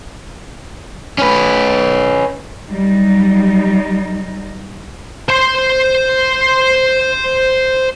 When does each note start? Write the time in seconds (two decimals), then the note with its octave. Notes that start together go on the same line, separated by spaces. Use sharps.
1.18 C#4 B4
2.69 F#3 G3 D#4
5.29 C5 C6